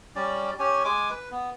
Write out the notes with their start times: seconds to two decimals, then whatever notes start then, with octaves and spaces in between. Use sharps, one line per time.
0.16 G3 C#4 D5
0.59 C#4 G4 C#5 G#5
0.84 G#3 G#5 D6
1.11 B4
1.32 B3